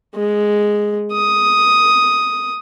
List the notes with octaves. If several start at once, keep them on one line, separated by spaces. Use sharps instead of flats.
G#3
D#6